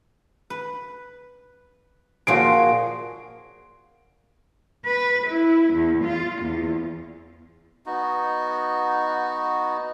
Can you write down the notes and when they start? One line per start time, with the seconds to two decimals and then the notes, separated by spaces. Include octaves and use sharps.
0.50 B4
2.27 A#2 F3 F#4 G#4 C6 D7
4.85 B4
5.27 E4
5.73 E2
6.04 F4
6.42 E2
7.86 B3 D#4 F#4